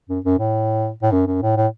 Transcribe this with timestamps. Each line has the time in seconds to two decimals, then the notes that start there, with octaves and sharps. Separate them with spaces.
0.09 F#2
0.24 F#2
0.39 A2
1.02 A2
1.12 F#2
1.27 F#2
1.42 A2
1.57 A2